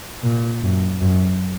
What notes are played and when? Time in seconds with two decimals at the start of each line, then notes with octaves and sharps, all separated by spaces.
0.23 A#2
0.62 F#2
1.00 F#2